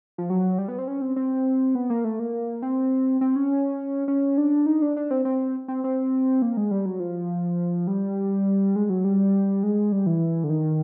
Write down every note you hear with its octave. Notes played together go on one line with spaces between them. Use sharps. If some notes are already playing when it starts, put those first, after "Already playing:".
F3
F#3
G3
B3
C4
C#4
C4
C4
B3
A#3
A3
A#3
C4
C4
C#4
C#4
D4
D#4
D4
D4
C4
C4
C4
C4
A#3
G#3
G3
F#3
F3
G3
G#3
F#3
G3
G#3
G3
E3
D3
D#3